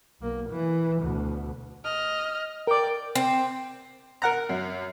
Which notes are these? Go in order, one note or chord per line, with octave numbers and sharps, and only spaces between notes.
B1 A#3
E3
D2 B2
D#5 F6
A#4 D5 G5 D6
C4
A#4 F#5 A#5
F#2